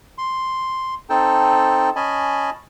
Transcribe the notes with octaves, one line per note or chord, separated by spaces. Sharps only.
C6
C4 D#4 A4 G5 A5
C#4 D#5 G#5 A5 B5